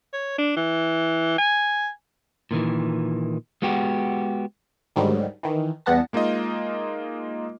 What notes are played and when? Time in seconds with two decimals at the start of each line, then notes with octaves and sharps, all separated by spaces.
0.13 C#5
0.38 D4
0.56 E3
1.38 G#5
2.51 A#2 D#3 E3
3.62 G#3 B3 F#4 G4
4.96 D2 G#2 D3 D#3 F#3 G3
5.43 D#3 E3
5.86 E2 G3 B3 F#5 A5 A#6
6.13 G#3 A#3 D#4 F4 D#5